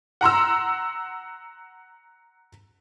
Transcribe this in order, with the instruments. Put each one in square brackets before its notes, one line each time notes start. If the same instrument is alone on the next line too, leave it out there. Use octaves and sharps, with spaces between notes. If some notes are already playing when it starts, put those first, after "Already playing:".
[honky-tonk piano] F#5 A#5 C6 E6